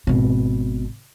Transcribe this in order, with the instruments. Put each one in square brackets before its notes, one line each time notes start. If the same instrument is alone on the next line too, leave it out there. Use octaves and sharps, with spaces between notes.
[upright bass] G#1 B2